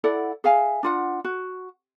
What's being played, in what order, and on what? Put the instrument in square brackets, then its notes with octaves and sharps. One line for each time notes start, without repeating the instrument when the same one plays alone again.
[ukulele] E4 A4 D5 F#5
G#4 E5 F5 G#5
D4 F4 F#5
F#4